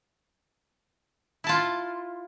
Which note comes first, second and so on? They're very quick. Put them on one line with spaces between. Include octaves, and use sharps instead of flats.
E4 A5 F4